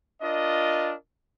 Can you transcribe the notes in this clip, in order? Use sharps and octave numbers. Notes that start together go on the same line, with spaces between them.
D4 F4 A#4 D#5